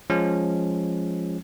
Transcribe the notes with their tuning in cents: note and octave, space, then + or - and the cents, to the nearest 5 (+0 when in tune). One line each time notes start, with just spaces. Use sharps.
F3 +0 G#3 +0 C#4 +0